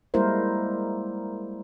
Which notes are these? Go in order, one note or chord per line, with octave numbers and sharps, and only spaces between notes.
G3 G#3 A#3 E4 A#4 C5